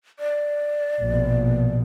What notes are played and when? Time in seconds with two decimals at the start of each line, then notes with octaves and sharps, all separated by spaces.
0.19 D5
1.00 A#1 B2